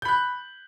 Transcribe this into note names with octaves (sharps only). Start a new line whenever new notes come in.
B5 F#6 G6